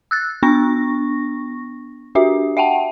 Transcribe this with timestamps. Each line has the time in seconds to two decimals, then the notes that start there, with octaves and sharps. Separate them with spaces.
0.11 E6 F#6 A6
0.43 B3 D4 C#6 A#6
2.15 D4 F#4 G4 E5
2.57 E5 F#5 G5 A5